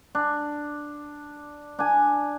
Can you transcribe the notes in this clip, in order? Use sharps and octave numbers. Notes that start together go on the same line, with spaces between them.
D4
D4 G#5